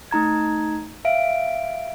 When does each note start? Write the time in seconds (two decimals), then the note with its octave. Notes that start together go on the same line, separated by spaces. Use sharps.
0.11 A3 D#4 A#5 G#6
1.05 E5 F5 D7